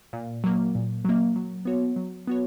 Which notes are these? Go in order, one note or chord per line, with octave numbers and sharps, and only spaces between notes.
A#2
F#3 A#3
A#2
F#3 A#3
F#3
B3 F#4 C#5
F#3
B3 F#4 C#5